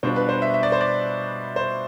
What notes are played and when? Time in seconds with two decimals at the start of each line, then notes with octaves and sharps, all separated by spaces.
0.03 B2 G3 D4 F4 C5
0.16 B4
0.29 C5
0.42 E5
0.54 E5
0.63 D5
0.72 C5
0.81 D5
1.56 C5